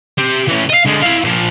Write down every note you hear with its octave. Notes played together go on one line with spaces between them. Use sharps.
G4 C5
E3 C#4
D#5 F5
D3 G#3
E4 F5
A#2 F3